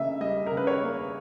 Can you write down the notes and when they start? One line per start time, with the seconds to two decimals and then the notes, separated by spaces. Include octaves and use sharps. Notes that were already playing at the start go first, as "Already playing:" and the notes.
Already playing: C#3 A#3 D#5 E5
0.21 G3 D#5
0.46 A#4
0.52 C#3
0.57 B4
0.67 C#5
0.83 A#3